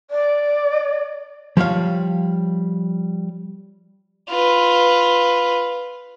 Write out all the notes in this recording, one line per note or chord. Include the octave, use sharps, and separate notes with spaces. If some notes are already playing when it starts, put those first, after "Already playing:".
D5
F3 G3 C#5 F5
F4 B4